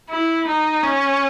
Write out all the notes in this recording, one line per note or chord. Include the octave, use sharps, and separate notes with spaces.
E4
D#4
C#4